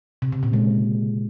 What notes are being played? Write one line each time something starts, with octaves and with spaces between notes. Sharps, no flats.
C3
C#3
A#2
G#3